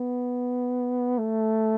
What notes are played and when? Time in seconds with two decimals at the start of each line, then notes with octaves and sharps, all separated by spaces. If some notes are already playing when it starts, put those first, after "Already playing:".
Already playing: B3
1.19 A3